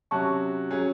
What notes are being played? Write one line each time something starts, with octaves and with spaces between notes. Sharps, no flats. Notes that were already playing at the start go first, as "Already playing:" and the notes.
C3 F#3 C#4 F#4 A5 C#6
F#3 C#4 G#4